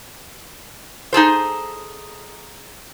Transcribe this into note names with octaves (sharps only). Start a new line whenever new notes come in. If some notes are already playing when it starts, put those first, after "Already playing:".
D#4 G#4 A4 C5